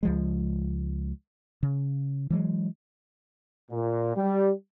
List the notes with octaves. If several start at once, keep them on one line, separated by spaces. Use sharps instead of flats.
C#2 F3 G#3
C#3
E3 F#3 G#3
A#2
G3